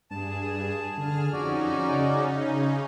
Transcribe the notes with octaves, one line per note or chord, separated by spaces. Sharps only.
G2 G#4 A5
D3 G#4 F6
F2 C#4 D#4 F#4 D5
C#3